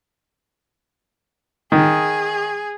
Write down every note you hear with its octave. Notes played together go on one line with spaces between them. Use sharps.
D#3 G#4